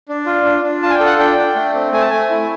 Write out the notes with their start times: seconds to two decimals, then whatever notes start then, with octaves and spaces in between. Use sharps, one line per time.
0.09 D4
0.26 F4
0.45 D4
0.63 D4
0.82 F4 A5
0.90 G#5
0.94 G5
1.00 A4
1.06 F#5
1.19 D4 G5
1.38 D4
1.56 A3
1.74 C4
1.92 A3 G#5
2.01 A5
2.10 A3 G#5
2.30 E4